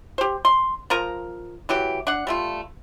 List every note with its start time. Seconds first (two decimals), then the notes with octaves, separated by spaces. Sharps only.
0.18 G4 C5
0.45 C6
0.90 F3 F4 A#4 A#5
1.69 E3 F#3 G4
2.07 D4 F#5
2.27 G3 A3 F4